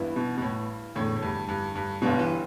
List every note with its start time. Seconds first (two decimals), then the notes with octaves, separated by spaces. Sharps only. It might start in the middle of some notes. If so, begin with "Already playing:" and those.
Already playing: G2 E3 B3 E4
0.16 B2
0.38 B2
0.42 A2
0.95 E2 A2 D3 A3
1.16 A2
1.22 G2
1.48 G2
1.75 G2
2.02 G1 G2 B2 G3 B3 D4
2.19 E3